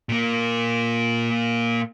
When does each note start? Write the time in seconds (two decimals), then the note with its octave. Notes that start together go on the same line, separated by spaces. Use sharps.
0.09 A#2 A#3